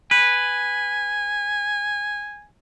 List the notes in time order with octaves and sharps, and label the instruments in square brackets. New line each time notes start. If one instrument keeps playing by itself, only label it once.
[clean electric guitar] B4 [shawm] G#5